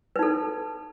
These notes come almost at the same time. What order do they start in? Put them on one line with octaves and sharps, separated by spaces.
B4 D#4 A4